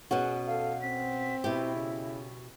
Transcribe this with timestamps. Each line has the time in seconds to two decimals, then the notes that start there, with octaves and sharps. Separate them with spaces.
0.11 B2 C#4 F#4 G#4
0.47 A4 F5
0.81 C4 B6
1.44 B2 E4 G4
1.75 C#3